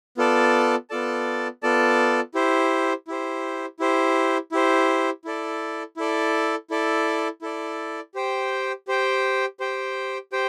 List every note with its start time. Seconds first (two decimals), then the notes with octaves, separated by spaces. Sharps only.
0.17 B3 F4 A4 D5 A5
0.90 B3 F4 A4 D5 A5
1.63 B3 F4 A4 D5 A5
2.34 E4 G4 C5
3.08 E4 G4 C5
3.80 E4 G4 C5
4.52 E4 G4 C5
5.25 E4 A4 D5
5.97 E4 A4 D5
6.70 E4 A4 D5
7.42 E4 A4 D5
8.15 G4 C5 G5
8.88 G4 C5 G5
9.60 G4 C5 G5
10.32 G4 C5 G5